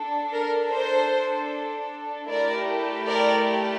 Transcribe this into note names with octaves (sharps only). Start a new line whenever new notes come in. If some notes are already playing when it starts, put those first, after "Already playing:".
Already playing: D4 A4
A#4
C5
A3 E4 G4 A#4 D5
A#4 D5